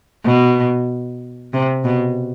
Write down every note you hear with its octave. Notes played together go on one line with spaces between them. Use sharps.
B2
C3
B2